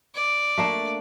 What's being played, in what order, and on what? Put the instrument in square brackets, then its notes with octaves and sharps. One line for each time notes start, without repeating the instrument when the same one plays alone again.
[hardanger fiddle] D5
[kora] A3 A#3 D4